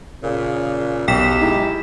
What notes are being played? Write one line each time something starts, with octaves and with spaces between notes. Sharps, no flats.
A#2 C#3
B1 G4 G5 B6 E7
G#3 D#4 E4